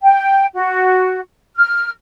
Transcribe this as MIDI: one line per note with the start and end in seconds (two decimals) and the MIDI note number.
0.03 0.46 79
0.55 1.20 66
1.56 1.89 89